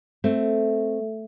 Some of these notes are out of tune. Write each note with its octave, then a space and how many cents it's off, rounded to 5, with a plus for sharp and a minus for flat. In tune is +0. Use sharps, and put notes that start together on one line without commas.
A3 +0 C4 +0